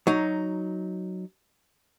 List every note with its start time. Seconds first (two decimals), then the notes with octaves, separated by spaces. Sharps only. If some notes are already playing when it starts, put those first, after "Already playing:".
0.07 F#3 D#4